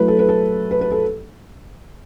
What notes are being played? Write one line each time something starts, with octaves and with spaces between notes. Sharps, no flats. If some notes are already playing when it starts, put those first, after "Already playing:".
Already playing: F#3 A3 E4 B4
A4
B4
A4
B4
B4
A4